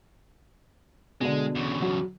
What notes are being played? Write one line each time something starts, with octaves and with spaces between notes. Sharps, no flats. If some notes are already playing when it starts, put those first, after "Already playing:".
B2 D3 G#3
E2 C#3
F#3